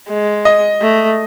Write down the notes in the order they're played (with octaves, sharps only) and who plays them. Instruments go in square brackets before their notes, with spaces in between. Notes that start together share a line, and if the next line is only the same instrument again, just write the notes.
[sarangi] G#3
[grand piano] D#5
[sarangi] A3